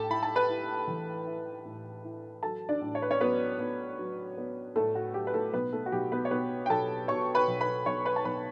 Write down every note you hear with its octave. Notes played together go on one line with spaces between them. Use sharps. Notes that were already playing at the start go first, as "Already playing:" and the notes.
Already playing: A2 G4 A4 A5
E4 B5
A5
B4 B5
E4
E3
E4
A2
E4
F#3 A4 A5
D4 D5
A2
C#5
B4
C#4 C#5
F#3 B3 B4
B3
F#3
B3
A2 A3 A4
F#4
F#3 G4
B4
A3 A4
B1 B3 B4
A3 A4
F#4
B1 G4
B3 B4
C#5
B2 B3 B4
G5
B1 A4 A5
B2 C#5 C#6
B4 B5
B1
B4 B5
B1 C#5 C#6
B4 B5
A5
B1 B4 B5